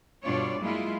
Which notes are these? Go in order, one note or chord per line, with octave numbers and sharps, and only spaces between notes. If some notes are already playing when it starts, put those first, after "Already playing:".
G2 B2 D4 F4 C#5 D5
F#3 G#3 A#3 E4 F4